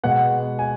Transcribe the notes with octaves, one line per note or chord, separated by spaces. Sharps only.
B2 G#3 B3 F#5
G#5